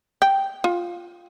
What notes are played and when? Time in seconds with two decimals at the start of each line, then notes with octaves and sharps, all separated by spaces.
0.22 G5
0.64 F4